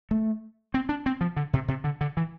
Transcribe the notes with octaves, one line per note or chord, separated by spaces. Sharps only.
A3
C4
D4
C4
F3
D3
C3
C3
D3
D3
E3